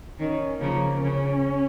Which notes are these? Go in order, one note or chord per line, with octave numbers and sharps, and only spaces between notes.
D#3 C#4
C#3 F3 A#3
C#3 C#4